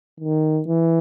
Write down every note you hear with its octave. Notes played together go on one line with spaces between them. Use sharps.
D#3
E3